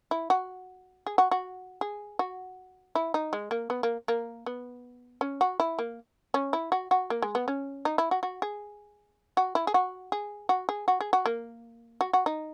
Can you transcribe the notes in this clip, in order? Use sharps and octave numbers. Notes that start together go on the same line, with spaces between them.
E4
F#4
G#4
F#4
F#4
G#4
F#4
E4
D#4
G#3
A#3
B3
A#3
A#3
B3
C#4
F#4
E4
A#3
C#4
E4
F#4
F#4
A#3
G#3
B3
C#4
D#4
E4
F#4
F#4
G#4
F#4
E4
G#4
F#4
G#4
F#4
G#4
F#4
G#4
F#4
A#3
F#4
F#4
D#4